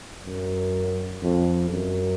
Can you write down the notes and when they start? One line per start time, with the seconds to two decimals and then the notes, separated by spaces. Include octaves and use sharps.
0.24 F#2
1.22 F2
1.71 F#2